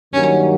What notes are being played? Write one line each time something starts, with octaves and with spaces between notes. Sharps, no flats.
G2 D#3 F#3 A#3 C#4